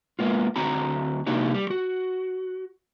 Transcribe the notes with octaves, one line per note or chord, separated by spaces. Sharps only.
G#3 A#3 B3 F4
D2 C4 F#4 A#5 B5
C3 A#3 D4 D#4 F#4 G4
G3
F#4